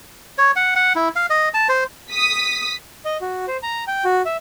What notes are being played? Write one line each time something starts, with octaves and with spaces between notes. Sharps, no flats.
C#5
F#5
F#5
E4
F5
D#5
A5
C5
D#6 B6
D#5
F#4
C5
A#5
G5
F#4
E5